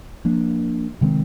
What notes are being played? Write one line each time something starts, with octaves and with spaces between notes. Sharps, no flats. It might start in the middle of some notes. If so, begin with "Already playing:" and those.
F3 A#3 D4
C3 D#3 G#3 C4